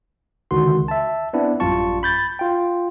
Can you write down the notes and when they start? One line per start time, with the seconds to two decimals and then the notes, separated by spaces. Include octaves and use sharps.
0.51 C#2 D3 D#3 F#4 C6
0.88 E5 A5
1.33 B3 C4 D4 E4
1.60 A1 F#2 G3 F4 A5 C#6
2.03 B5 G6 A6
2.39 F4 G5